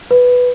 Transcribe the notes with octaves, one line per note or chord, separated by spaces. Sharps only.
B4